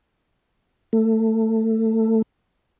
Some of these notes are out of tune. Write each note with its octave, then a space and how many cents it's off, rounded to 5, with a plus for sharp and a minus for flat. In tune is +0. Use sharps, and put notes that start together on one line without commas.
A3 +20